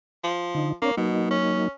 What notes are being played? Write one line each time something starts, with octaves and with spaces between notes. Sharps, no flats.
F3
D3 D#4
A#3 C4 D4 C#5
B2 F#3 A#3 D#4
C#4